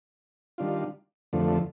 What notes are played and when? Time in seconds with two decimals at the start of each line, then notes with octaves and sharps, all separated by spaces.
0.58 D#3 G3 D4 F4
1.33 F2 D3 F3 A3